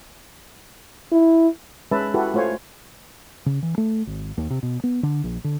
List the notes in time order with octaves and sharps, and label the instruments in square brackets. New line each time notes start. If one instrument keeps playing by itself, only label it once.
[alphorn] E4
[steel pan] G#3 C#4 B4 E5 A5
E4 F#4 G4 A4 B4
A3 F4 C5 C#5 G#5
[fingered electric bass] C#3
E3
A3
G#1
D#2
C3
B2
B3
D3
A#1
D3